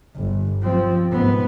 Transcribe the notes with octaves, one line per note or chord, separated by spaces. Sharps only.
G1
F3 C4
G#2 B3